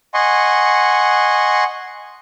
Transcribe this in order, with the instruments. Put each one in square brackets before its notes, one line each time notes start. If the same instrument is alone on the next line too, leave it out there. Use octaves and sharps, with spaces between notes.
[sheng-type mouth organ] D#5 F#5 G#5 C6 C#6